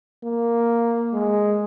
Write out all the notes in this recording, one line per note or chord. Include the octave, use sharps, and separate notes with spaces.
A#3
G#3